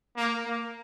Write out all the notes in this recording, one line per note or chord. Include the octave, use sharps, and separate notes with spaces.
A#3
A#3